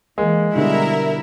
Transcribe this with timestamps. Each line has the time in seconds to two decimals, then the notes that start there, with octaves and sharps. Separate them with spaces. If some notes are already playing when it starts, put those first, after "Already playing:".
0.18 E3 G#3 A#3
0.55 B2 D3 G3 E4 A#4 E5